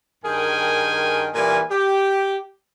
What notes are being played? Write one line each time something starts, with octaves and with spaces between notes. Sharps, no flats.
G2 D#3 G#4 A#4 G5 G#5
A#2 E3 G3 A#4 G#5
G4